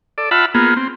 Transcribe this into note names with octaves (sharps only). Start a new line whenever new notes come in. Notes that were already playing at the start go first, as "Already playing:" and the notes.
A4 D5
F4 E5 F#5 A5 B5
A#3 B3 F4 G#4
C4